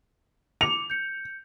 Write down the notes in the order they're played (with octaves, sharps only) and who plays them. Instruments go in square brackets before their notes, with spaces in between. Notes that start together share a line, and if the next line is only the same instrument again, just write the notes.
[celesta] D6 C#7 [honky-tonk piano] F7
[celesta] G6 C#7